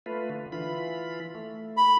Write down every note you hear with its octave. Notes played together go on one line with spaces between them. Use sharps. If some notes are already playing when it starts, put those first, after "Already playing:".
A3 F4 B4
D3
E3 F4 B5
A3
B5